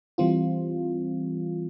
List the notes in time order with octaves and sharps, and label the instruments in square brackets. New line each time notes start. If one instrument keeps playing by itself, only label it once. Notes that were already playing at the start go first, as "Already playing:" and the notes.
[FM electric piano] E3 G3 C4 F4